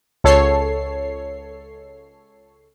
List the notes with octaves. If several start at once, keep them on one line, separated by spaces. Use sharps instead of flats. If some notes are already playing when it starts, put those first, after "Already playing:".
C#2 A4 C#5 C7